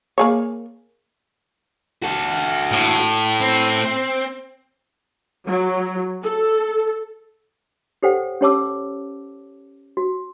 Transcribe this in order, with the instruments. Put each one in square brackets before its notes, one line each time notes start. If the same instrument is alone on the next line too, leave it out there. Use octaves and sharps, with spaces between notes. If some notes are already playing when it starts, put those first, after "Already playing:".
[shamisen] A#3 G#4 C#5
[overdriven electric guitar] F#4 A4
[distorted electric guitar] A2
[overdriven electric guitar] C4
[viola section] F#3
A4
[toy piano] G4 A4 C5 C#5 F#5 G5
C#4 G4 C#5 A5 D6 E6
F#4